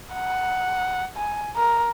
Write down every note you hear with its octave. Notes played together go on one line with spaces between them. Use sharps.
F#5
G#5
A#4